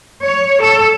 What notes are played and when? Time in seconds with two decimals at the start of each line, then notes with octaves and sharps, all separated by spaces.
0.23 C#5
0.61 A4